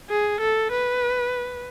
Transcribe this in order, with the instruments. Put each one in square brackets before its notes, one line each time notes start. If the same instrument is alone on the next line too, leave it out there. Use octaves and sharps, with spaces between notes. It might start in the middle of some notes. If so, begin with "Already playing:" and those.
[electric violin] G#4
A4
B4